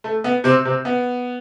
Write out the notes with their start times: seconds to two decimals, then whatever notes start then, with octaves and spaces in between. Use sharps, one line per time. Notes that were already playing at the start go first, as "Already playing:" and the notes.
0.04 A3
0.24 B3
0.44 C3 C4
0.65 C3 C4
0.85 B3